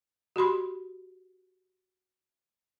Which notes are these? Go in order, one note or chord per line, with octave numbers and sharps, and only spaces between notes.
F#4 G4 B5 C6